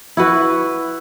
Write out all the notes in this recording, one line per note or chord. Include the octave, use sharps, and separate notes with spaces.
E4 F#4 B4